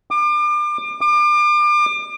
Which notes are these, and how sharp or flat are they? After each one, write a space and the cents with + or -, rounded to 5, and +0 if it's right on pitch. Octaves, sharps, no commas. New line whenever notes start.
D6 +35
D6 +35